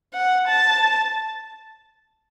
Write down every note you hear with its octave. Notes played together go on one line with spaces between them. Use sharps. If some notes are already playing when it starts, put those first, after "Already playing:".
F#5
A5